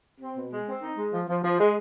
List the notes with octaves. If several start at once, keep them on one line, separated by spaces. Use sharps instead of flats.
C4
B2
G#3
C4
D#4
G#3
F3
F3
F3
G#3